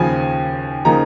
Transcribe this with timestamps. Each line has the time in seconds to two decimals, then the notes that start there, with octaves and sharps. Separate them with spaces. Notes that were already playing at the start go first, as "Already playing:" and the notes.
Already playing: D#2 C#3 F3 G#5
0.85 C#3 F3 A#3 D#4 A#5